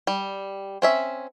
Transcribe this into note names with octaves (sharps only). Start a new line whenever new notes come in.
G3
C4 C#4 E5